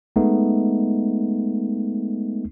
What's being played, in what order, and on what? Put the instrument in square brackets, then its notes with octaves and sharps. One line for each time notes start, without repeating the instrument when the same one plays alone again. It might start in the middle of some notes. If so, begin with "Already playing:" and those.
[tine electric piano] G#3 A3 B3 D#4